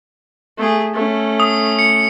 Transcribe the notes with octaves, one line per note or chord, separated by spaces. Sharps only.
A3 G#4
A3 C#4
D#6
C#7